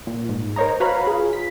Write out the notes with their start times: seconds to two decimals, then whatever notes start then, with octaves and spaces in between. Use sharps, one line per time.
0.07 A#2
0.29 G#2
0.56 A#4 C5 C#5 D#5 A#5
0.80 F#4 B4 C#5 F5 A#5 B5
1.07 F4 G#4
1.33 B6